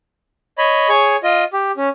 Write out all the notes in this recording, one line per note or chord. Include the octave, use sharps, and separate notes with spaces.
C#5 D#5 B5
G#4 C#5 C#6
F4 D#5
G4
C#4